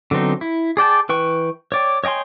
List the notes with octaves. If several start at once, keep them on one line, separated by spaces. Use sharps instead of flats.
D3 F#3 B3 C4 D#4
E4
G#4 D5 G5 A5
E3 B4 G5 C#6
C#5 D5 G5
C#5 D#5 G5 G#5 C6